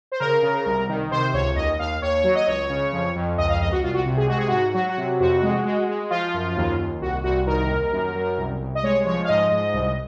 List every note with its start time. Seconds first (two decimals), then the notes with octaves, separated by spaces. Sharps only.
0.12 C5
0.20 C#3 A#4
0.43 C#3
0.66 C2
0.89 D#3
1.11 C3 C5
1.33 C#2 C#5
1.56 D#2 D#5
1.79 D#2 F5
2.02 D#2 C#5
2.24 F#3
2.35 D#5
2.47 C#2 C#5
2.69 C#3
2.92 F2
3.15 F2
3.38 C#2 D#5
3.49 F5
3.61 C#2 D#5
3.72 F#4
3.83 C2 F4
3.94 F#4
4.06 C3
4.17 G#4
4.29 G#3 F#4
4.38 G#4
4.48 G#2 F#4
4.74 F#3 F#4
4.89 F#4
4.97 C3
5.20 F2 F#4
5.42 G#3
5.65 G#3
5.88 G#3
6.10 F3 F4
6.34 F#2
6.57 D#2
6.79 D#2
7.01 C2 F#4
7.24 C2 F#4
7.47 D#3 A#4
7.70 D#2
7.92 F#2
8.15 F#2
8.38 C2
8.60 C2
8.75 D#5
8.83 G#3 C#5
9.05 F3 C#5
9.24 F5
9.28 G#2 D#5
9.51 G#2
9.73 C2